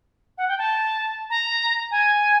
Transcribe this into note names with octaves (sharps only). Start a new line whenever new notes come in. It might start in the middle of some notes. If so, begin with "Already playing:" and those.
F#5
G5
A5
A#5
G#5